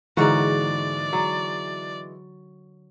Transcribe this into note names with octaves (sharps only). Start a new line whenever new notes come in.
G#2 D3 E3 G#3 A#3 F#4 D5 A#5
F#3